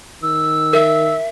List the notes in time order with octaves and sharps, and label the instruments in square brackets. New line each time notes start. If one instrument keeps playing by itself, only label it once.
[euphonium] D#3 [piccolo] E6
[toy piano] A#4 [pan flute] E5